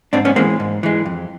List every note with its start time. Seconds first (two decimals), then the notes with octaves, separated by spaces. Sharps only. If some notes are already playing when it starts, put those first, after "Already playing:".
0.13 G#2 C4 D4
0.25 B3 C#4
0.36 E3 G#3 A#3 C4
0.60 G#2
0.83 E3 G#3
1.06 F2